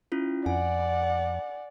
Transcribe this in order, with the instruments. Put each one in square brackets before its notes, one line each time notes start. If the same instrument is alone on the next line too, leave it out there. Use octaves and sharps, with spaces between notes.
[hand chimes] C#4 E4 F4
[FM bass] F2 [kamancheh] D5 F#5 [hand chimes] G#5